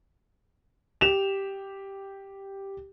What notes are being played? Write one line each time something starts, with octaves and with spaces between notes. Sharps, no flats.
G4 E7 F7